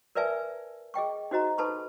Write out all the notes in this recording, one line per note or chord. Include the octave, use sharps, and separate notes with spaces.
A#4 B4 D5 E5 G#5 A5
G#4 D#5 G5 C#6
D#4 F#4 C5 D#5 A#5
D#4 A4 B4 A5 B5 C#6